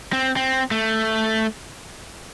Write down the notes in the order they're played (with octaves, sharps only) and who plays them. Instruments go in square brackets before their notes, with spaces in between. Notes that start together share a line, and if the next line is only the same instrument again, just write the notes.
[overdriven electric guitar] C4
C4
A3